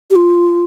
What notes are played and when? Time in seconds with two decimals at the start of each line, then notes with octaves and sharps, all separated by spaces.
0.10 G4
0.16 F4